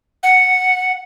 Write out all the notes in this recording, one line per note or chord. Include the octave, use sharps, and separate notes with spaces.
F#5